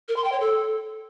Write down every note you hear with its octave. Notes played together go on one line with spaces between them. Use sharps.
A#4
C6
G5
C#5
A4